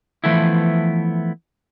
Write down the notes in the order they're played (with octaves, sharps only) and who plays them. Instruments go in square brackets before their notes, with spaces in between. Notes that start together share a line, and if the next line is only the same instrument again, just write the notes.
[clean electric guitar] E3 F3 A3 B3 E4